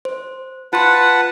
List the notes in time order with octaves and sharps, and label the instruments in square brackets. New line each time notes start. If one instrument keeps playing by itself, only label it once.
[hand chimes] C5
[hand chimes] F4 C6 [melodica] B4 F#5 A5